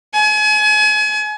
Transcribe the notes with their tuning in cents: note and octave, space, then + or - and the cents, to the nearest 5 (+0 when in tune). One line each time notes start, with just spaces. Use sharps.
G#5 +35